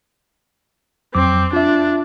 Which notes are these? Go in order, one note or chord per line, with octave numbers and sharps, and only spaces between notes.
F2 F#3 C4 D6
D4 F4 E5